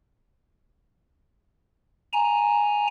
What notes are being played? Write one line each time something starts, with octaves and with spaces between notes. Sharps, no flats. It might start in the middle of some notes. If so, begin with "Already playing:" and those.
G#5 A#5